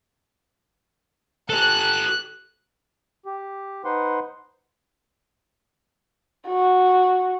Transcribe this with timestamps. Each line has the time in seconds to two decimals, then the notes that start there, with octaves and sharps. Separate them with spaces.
1.50 G4 A4 F#6
3.26 G4
3.85 D#4 B4 C5 F#5 C6
6.47 F#4